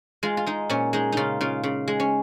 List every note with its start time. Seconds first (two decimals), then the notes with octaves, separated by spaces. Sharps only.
0.23 G#3 F4
0.37 F4
0.46 G#3 D#4
0.70 A#2 C#4
0.93 G#3 D#4
1.12 C#3 D#4 F4
1.41 C#3 F4
1.63 C#3
1.88 G#3
2.00 C#4